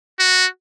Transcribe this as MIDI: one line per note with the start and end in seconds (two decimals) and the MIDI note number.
0.19 0.47 66